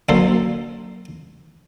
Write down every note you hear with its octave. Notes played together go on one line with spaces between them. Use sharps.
F#2 D3 A#3 A4 C5